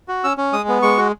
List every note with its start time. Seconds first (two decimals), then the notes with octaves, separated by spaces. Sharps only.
0.08 F#4
0.24 C#4 E6
0.37 C#4
0.52 G#3 D#6
0.68 B3
0.82 G#3 C#6
0.97 F#4